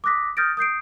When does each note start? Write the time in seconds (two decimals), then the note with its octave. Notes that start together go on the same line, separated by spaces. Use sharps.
0.04 D6 D#6 F#6 A#6 B6
0.37 D#6 F6 G6 A6 A#6 D7
0.57 D#6 G6 C7 D7